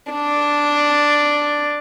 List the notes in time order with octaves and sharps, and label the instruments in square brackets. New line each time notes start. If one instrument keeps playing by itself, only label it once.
[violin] D4